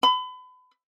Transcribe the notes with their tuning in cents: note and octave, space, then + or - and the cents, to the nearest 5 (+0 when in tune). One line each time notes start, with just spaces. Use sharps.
B5 +35